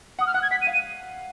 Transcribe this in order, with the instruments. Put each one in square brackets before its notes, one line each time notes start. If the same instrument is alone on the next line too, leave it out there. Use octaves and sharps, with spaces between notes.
[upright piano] F#5 [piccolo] D#6
[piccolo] F6
[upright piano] F#5 [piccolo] F#6
[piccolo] G#6
[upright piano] F#5 [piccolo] B6
[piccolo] D#7
[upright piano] F5
[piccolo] D#7